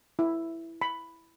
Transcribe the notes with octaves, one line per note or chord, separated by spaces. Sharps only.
E4
B5